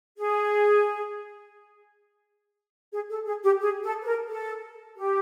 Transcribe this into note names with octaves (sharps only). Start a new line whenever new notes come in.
G#4
G#4
A4
G#4
G4
G#4
A4
B4
A#4
A4
G4